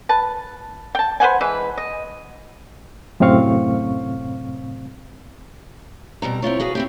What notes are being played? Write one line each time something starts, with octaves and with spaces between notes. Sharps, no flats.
B4 A5
G5 A5
B4 C5 F#5 G#5
E3 G#3 B4
D#5
F#2 A2 C3 C4 F5 C#6
B2 G3 C4 A#5
C4 E4 F4 C#5
F#4 G#4 B4 F5
C4 E4 G4